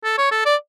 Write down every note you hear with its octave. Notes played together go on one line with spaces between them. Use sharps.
A4
C#5
A4
D5